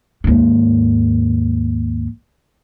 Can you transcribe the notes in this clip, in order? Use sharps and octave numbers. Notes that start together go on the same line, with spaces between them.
D#2 G#2